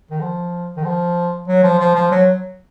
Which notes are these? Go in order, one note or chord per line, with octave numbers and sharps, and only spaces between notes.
D#3
F3
D#3
F3
F#3
F3
F3
F3
F#3